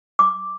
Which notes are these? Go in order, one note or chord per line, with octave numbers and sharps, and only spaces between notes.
D6